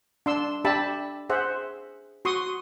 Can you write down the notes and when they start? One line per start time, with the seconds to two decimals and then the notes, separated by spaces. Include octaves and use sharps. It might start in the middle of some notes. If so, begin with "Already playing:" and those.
0.26 D4 C6 E6
0.64 D4 G4 E5 A5 B5
1.30 G#4 C5 E5 F#5
2.25 F#4 C6 C#6 D#6